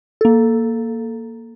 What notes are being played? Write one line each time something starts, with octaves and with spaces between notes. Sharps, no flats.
A#3 A4